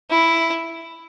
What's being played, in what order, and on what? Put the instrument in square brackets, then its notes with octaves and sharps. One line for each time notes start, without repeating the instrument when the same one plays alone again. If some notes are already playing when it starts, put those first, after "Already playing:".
[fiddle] E4